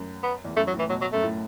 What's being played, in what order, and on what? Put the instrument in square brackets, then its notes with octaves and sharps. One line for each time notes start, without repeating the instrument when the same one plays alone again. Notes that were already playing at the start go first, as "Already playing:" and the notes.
Already playing: [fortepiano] F#2
[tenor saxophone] B3
[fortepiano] E2
[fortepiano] F#2 [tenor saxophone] A3
[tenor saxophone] F#3
[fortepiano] A2
[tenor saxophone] E3
[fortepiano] B2 [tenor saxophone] F#3
[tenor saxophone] F#3
[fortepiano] F#2 [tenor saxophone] A3
[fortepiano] A2